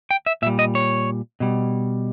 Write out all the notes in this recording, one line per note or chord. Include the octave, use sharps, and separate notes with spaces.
G5
E5
A#2 G3 E5
D#5
C#5
B2 G3